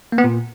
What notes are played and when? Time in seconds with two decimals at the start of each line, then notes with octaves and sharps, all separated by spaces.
0.12 A#3
0.18 B3
0.24 A#2